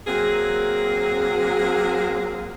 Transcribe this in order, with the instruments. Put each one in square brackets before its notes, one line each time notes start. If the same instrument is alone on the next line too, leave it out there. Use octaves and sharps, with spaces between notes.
[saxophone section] F#3 A#3 C4 G#4